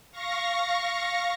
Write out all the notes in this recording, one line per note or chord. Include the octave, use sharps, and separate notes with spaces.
F5 C#6 A#6